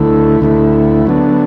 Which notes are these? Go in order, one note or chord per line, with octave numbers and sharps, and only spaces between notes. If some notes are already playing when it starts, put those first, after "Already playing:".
Already playing: D2 D3 A3 E4
D2 D3 A3 E4
D3 F#3 B3 D4